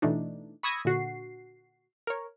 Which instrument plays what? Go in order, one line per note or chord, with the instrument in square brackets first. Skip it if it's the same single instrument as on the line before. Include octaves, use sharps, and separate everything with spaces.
[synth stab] B2 E3 A3 D4 D#4
B5 C#6 D#6 E6 G#6 A#6
A#2 D3 F#4 C7
A#4 C#5